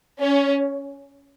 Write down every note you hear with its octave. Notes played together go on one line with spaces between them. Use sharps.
C#4